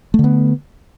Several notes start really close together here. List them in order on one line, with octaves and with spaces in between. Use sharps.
A3 D3 B3